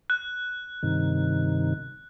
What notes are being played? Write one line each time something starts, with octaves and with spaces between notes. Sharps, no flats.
F#6
G2 C3 D#3